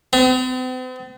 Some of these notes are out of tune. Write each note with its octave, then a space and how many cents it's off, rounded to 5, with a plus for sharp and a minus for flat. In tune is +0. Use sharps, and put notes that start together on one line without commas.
C4 -45